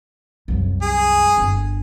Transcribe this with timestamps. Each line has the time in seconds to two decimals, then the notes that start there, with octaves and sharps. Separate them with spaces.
0.48 C2 F#2
0.82 G#4
1.37 G1 D3